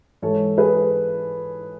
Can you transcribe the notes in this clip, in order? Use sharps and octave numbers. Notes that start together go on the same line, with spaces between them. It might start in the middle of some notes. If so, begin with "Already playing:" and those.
G#2 E3 G#3 A4 C#5
G#4 B4